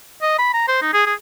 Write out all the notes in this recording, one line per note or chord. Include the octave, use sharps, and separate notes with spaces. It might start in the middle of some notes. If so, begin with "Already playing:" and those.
D#5
B5
A#5
C5
D#4
G#4
G#4